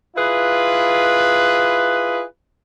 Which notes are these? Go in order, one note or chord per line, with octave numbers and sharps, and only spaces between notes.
E4 F4 G#4 B4